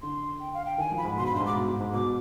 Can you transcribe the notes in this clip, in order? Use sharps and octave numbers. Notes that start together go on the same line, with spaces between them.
D3 C6
G5
F5
G5
D#3 G#5
F3
B5
G#2
B2 C6
G#2 B5
G2 C6
G#2
D6
B2
G#2
G#2
B2 D6